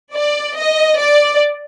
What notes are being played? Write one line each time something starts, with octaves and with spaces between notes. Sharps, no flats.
D5
D#5
D5